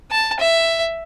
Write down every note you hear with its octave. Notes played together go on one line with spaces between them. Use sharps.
A5
E5